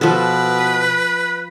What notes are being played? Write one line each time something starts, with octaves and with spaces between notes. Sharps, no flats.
B2 F3 A4 B4